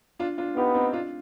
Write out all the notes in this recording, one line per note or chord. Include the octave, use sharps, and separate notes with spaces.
D4 F4
D4 F4
B3 D#4 G4
C4 D#4
D4 F4